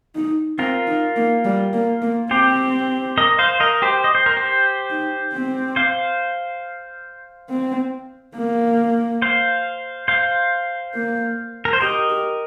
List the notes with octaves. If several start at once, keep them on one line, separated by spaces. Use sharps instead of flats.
D#4
C4 F4 A#4
D#4
A#3
G3
A#3
A#3
C4 G4 C5
A#4 D#5
C5 F5
A#4 D#5
G4 C5
D#5
C5
A#4
G4 C5
D#4
C4
C5 F5
C4
A#3
C5 F5
C5 F5
A#3
A#4
C5
G4 A#4 D#5
G4